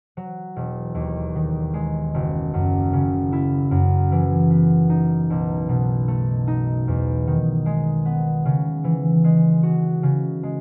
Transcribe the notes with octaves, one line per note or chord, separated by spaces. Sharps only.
F#3
E1
D#2
D#3
G#3
F#1
F#2
C#3
E4
F#2
E3
B3
D#4
B1
B2
A3
D#4
E2
D#3
G#3
B3
C#3
E3
G#3
F#4
C#3
G#3